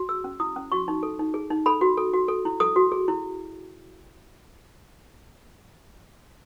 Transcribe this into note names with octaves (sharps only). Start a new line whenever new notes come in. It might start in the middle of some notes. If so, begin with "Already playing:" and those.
Already playing: F#4
G#4 E6
C#4
E4 D#6
C#4
F#4 C#6
D#4
A4
D#4
G#4
D#4
A4 B5
F#4
A4
F#4
A4
E4
A4 D#6
F#4
G#4
E4